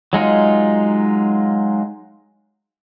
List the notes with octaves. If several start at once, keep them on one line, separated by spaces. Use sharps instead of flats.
F#3 G#3 D#4 F4